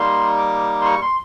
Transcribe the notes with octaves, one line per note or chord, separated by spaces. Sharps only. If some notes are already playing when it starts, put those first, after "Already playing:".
Already playing: G3 A#3 D#4 C6
D6
C6
C#6
C6